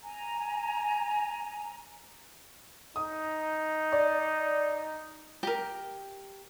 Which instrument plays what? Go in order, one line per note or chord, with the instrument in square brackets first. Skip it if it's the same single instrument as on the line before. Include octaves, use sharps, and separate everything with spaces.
[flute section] G#5 A#5
[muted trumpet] D#4 [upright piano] D#6
[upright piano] D5
[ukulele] G4 A#4